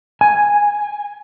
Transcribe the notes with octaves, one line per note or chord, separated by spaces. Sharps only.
G#5